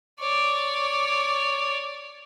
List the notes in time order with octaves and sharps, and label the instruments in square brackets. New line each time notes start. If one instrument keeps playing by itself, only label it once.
[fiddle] C#5 D5